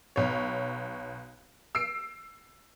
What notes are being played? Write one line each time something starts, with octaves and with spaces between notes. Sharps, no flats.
B1 C#5
E6 C7 D7